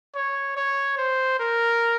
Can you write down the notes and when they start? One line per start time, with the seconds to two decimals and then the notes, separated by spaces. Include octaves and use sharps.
0.15 C#5
0.57 C#5
0.98 C5
1.39 A#4